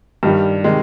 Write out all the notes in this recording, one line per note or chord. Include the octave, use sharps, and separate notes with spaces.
G2 D#3 G3
C3 D#3 G#3